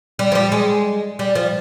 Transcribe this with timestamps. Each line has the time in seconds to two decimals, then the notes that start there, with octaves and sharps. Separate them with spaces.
0.19 G3
0.32 F3
0.35 G3
0.52 G#3
1.19 G3
1.35 F3